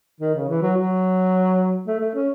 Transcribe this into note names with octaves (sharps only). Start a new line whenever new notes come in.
D#3
C#3
E3
F#3
F#3
A3
A3
C#4